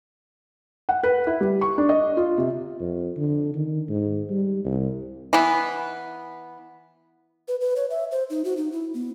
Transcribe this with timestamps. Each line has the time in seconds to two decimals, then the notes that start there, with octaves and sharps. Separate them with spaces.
0.89 F#5
1.03 B4
1.27 E4
1.41 G3
1.61 C#6
1.78 D4
1.89 D#5
2.17 F4
2.38 C3
2.80 F2
3.17 D3
3.54 D#3
3.89 G#2
4.30 G3
4.65 C2
5.33 E3 B3
7.48 B4
7.61 B4
7.76 C#5
7.90 E5
8.11 C5
8.30 D#4
8.45 F#4
8.57 D#4
8.72 E4
8.94 B3